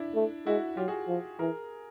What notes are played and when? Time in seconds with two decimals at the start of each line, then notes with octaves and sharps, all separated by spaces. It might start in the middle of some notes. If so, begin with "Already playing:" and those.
Already playing: D4 E4
0.15 A3
0.46 G#3 E4 F#4
0.77 F#3 F4 G4
0.88 F#4 G#4
1.08 F3
1.39 E3 G#4 A#4